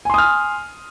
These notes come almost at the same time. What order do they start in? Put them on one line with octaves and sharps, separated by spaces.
G#5 C6 D#6 F6